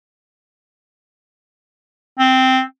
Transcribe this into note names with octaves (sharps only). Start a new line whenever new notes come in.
C4